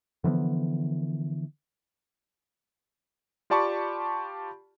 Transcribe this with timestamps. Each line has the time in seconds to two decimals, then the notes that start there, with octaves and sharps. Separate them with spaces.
0.24 D3 E3 F3 B3
3.50 F4 G4 D5 A5 B5 C#6